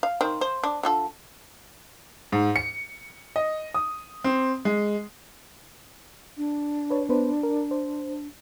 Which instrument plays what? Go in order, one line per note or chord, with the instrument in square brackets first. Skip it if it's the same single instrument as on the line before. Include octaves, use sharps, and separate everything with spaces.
[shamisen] F5
D#3 C4
C5
D4
D3 F4 A4
[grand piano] G#2
C#7
D#5
D#6
C4
G#3
[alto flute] D4
[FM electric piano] B4 C#5
B3 B4 C5
A#4
C5